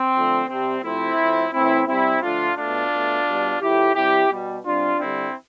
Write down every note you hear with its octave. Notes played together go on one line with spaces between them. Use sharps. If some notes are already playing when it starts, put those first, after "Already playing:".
Already playing: C4
D3 F3 A3
C3 G3 C4
C3 F3 A3 C4 E4
A2 F3 A3
A2 E3 A3 C4 E4
C3 G3 C4 E4
D3 F3 A3 D4 F4
B2 A3 D4 F4
B2 A3
B2 G3
A2 F3 A3 E4 G4
C3 G3 E4 G4
B2 G3
C3 G3 D4 F4
D3 G3 C4 E4